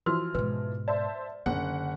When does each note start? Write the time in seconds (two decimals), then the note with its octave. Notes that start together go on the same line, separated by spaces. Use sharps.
0.06 E3 F3 F#4 C6 E6 F6
0.34 G#2 B2 B4
0.88 C5 D5 E5 A5
1.46 F#1 D3 F#5